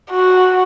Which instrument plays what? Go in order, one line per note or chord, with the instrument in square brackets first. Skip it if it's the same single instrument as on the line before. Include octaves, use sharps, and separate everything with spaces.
[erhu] F#4